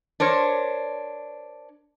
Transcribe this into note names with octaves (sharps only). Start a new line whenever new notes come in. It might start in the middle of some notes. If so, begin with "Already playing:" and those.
D4 A#4 C5 C#5